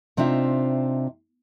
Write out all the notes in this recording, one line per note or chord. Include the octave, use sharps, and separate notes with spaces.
C3 C4 D4 D#4 F4 E5